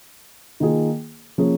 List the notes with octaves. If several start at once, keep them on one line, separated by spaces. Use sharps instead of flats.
D#3 A#3 F4 G#4
F3 A#3 C#4 G#4